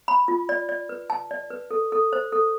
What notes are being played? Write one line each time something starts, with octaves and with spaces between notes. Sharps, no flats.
B5
F4
D5
D5
B4
A5
D5
B4
A4
A4
C5
A4